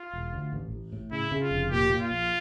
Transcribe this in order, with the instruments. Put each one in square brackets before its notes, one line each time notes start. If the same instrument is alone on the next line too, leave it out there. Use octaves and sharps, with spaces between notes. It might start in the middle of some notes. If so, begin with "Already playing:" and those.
Already playing: [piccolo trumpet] F4
[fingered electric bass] E1
D2
A1
A1
A2
[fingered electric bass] C#3 [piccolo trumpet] E4
[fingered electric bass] C#3
[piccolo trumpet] F4
[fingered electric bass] F1
[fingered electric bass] A#2 [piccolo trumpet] G4
[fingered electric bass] A#2
[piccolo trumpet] F4
[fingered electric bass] A#1